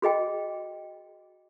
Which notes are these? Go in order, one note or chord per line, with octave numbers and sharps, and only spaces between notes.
F#4 G#4 D#5 G5